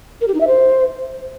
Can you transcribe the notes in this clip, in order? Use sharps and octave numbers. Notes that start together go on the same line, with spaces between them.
A#4
G4
D#4
E5
C5